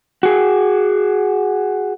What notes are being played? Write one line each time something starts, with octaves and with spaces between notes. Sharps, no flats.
F#4 G#4